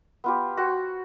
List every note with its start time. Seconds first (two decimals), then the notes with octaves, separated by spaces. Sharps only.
0.24 B3 F4 G4
0.57 F#4 C5 G5 C#6